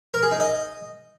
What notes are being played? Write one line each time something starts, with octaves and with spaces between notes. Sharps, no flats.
A#4
G#4
D#4
D#5